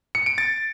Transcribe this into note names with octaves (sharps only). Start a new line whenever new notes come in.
C#7
D7
A6